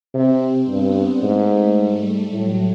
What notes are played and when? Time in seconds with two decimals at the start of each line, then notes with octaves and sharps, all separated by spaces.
0.14 C3 C4
0.68 G2 B3
1.23 G#2 A3
1.77 G3
2.32 A2 F#3